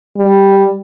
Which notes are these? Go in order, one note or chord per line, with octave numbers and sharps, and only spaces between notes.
G3